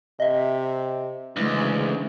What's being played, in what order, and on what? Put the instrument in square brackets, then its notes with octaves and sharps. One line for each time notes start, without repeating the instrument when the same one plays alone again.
[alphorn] C3 [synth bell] D#5 E5
[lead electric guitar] D2 [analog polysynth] C#3 G#3 [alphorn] E3